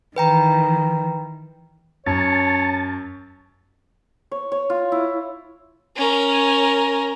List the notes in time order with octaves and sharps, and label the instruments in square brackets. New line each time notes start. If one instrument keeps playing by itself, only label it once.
[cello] D#3 E3 [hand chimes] B4 G5 A#5
[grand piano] F#2 [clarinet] C#5 [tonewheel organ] A5
[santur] C#5
C#5
F4
E4
[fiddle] C#4 A#4